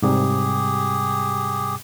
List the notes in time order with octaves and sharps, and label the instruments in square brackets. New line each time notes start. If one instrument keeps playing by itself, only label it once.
[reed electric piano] G#2 C3 G3 [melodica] G4 G#4